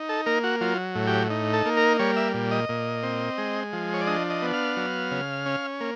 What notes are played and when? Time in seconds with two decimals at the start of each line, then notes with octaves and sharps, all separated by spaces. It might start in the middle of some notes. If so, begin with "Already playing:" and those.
Already playing: D#4
0.09 A4
0.26 A#3 A#4
0.44 F#4
0.61 F#3 F4
0.95 A2
1.07 G4
1.30 D#4
1.53 A4
1.65 A#3
1.77 A#4
1.99 G3 C#5
2.16 E5
2.34 A#2
2.51 D#5
2.69 A#2
3.03 C4
3.38 G#3
3.73 F3
3.94 C#5
4.01 D5
4.07 D4 D#5
4.30 D#5
4.42 B3
4.53 F5
4.77 F#3
5.11 C#3
5.46 C#4
5.81 A#3